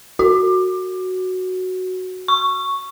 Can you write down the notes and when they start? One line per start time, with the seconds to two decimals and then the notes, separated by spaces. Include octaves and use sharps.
0.19 F#4
2.28 C#6